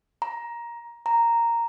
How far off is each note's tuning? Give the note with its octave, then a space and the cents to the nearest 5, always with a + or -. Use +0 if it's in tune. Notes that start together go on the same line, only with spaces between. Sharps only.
A#5 +15
A#5 -5